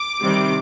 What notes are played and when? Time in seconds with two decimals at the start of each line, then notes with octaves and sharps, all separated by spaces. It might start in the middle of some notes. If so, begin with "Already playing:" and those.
Already playing: D6
0.20 C3 D#3 G3 C4